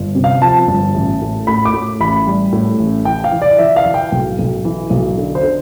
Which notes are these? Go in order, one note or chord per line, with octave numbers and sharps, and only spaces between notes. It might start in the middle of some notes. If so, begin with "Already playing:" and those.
Already playing: G1
C3
F5
F3 A5
G1
A1
A2
A2 B5
D6
A2
A1 B5
G3
A2
A1
E3 G5
F5
E3
D5
E3 E5
F5
E3
G5
B1
B1
E3
B1
D3
C5
D3